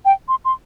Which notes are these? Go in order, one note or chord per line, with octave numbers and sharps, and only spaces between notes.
G5
C6
C6